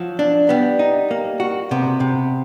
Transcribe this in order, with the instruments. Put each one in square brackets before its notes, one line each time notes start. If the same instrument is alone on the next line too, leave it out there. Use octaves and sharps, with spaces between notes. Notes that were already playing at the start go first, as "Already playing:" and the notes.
Already playing: [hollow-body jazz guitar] F3 [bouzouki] F#3
[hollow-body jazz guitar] D4
[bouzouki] G3 [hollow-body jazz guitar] B3
[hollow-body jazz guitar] D#4
A#3
F#4
[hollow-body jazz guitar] C3 [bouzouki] B3
[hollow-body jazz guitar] C3